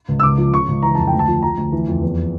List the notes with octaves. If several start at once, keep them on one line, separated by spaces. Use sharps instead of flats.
C#2
E6
C#2 D6
F3
C#3 C#6
C#2
E3 A#5
F2 A5
D2 G5
A5
F3
F3 A#5
D2
E3
F2
E2